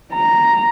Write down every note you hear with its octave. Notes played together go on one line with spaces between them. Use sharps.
A#5